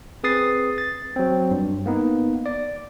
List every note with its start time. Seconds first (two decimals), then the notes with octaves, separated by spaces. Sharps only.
0.24 C4 G#4 B4 D#6 A6 C7
0.78 A6
1.16 F#3 C4
1.51 G2
1.86 A#3 B3 D#4
2.46 D5